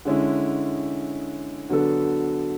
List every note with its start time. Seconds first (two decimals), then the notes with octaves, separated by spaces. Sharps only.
0.05 D3 G#3 C#4 E4
1.69 D3 F#3 B3 D4 A4